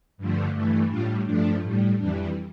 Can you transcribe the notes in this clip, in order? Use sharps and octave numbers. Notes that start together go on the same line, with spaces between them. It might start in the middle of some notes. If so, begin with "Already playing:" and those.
G2 D3 F3 A3
G2 E3 A3
A2 G3 D4 F4
G2 F3 A3 D4
A2 G3
F2 E3 G3 D4